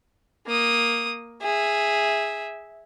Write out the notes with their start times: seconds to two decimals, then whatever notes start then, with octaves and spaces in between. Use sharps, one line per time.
0.47 A#3 D#6
1.42 G#4 E5